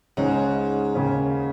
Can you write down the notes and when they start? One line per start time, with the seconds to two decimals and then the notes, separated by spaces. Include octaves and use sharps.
0.17 C#2 G#2 C#3 G#3 C#4 G#4
0.95 D#2 C#3 A#3 C#4